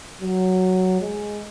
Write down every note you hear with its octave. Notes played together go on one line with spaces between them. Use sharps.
F#3
G#3